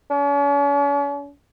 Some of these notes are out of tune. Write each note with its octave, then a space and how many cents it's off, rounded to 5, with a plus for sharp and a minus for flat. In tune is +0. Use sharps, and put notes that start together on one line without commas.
C#4 +45